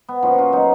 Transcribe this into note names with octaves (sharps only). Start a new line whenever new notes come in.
B3
A#2 F3 C#4
F#4
F4
B2 F#3 D#4